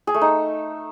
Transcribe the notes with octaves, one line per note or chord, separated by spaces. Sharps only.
G#4
A3
D#4